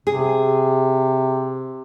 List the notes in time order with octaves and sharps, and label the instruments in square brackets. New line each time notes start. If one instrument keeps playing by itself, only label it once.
[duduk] C3 [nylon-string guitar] G#4